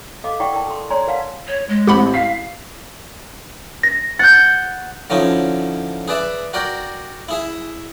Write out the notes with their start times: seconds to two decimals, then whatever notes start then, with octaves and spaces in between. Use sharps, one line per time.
0.24 A4 D#5 F5 D6
0.40 E4 D5 F#5 G5 C#6
0.53 A#4 G5 A5
0.67 A4 C6
0.90 C#5 D5 G#5 A#5 C6
1.07 A#4 B4 D5 F5 F#5 A5
1.47 C#5
1.69 G#3
1.87 A1 C4 G4 F#5 B5
2.14 F5 B6 C7
3.83 A#6
4.19 F#5 G6 A6
5.10 D3 F3 C#4 D#4 E4
6.08 G#4 B4 D5 E5
6.53 F#4 A#4 D5 G5
7.29 E4 G#4 E5